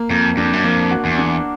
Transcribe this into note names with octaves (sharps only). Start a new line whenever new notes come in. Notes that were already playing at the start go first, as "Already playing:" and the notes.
Already playing: A#3
F2 A#3
F2 D4
F#2
F2 A#3
F#4
E2
D4